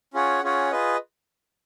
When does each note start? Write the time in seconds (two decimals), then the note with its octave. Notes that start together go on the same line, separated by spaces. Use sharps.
0.14 C#4 F4 G#4 C#5 F#5
0.43 C#4 F4 G#4 C#5 F#5
0.71 F4 G#4 B4 D#5